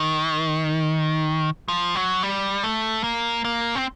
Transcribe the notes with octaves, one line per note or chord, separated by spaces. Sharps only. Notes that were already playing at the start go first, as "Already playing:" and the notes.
Already playing: D#3
F3
F#3
G3
A3
A#3
A#3
C4